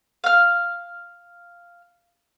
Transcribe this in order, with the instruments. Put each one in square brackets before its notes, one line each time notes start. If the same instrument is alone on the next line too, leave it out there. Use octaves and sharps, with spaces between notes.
[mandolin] F5 F6